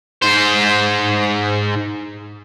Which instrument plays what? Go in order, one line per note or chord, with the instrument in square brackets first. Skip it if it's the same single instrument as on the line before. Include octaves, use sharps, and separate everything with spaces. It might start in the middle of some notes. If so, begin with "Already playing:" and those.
[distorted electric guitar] G#2 C5